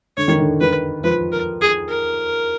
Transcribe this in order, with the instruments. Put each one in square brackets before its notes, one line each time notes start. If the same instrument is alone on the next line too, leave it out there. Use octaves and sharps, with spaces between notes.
[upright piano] D3 [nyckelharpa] C#5
[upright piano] D#3
D3
[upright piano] D#3 [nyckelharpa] B4
[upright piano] F3 [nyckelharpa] B4
[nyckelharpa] A#4
G#4
A#4